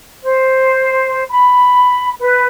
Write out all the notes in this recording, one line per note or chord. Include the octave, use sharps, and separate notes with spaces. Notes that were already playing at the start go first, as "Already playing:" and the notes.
C5
B5
B4